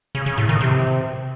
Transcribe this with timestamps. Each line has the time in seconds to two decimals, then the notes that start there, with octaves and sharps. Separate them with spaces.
0.15 C#3
0.26 C#3
0.38 A2
0.49 D#3
0.61 C3